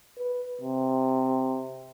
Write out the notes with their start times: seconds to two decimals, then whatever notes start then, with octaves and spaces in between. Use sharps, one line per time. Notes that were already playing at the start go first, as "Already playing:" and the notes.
0.18 B4
0.61 C3